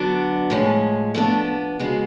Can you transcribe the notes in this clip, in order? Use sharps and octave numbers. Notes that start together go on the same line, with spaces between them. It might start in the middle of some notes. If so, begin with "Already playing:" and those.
Already playing: D3 F#3 B3 D4
A2 F3 G#3 C#4
F3 A3 B3 D4 A4
C#3 G#3 B3 F#4